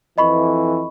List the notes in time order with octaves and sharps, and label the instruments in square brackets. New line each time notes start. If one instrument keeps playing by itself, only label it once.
[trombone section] F2 E3 [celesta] D#5 B5 C#6